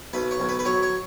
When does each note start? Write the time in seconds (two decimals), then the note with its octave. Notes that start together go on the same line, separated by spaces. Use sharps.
0.13 B1 B4
0.31 C#5
0.40 B1
0.49 B4
0.59 B4
0.65 F#3 C#5
0.83 C#5